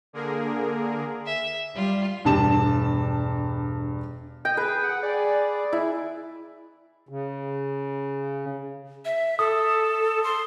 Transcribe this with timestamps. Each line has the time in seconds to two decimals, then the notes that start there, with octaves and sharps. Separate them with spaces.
0.13 D3 A#3 G#4 A#4
1.26 E5
1.75 G3 F4
2.25 E1 G2 G4 A5 E7
4.45 D#5 G5
4.57 G#4 B4
4.84 F#5
5.03 G#4 D5
5.73 E4
7.09 C#3
9.05 E5
9.39 A4 D#6
10.24 C6